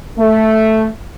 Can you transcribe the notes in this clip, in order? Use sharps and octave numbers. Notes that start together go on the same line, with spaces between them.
A3